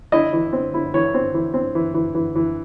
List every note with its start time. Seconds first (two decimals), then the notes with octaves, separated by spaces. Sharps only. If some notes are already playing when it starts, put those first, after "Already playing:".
0.12 E4 D#5
0.33 E3
0.53 C4
0.74 E4
0.94 E3 C#5
1.14 C4
1.34 E3
1.54 C4
1.75 E3
1.94 E3
2.15 E3
2.35 E3